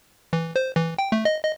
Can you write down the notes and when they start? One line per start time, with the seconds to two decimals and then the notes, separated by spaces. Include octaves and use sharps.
0.33 E3
0.56 C5
0.76 E3
0.98 G5
1.12 A3
1.25 D#5
1.43 D#5